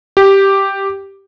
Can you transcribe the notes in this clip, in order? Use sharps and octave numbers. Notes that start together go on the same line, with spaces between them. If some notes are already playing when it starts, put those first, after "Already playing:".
G4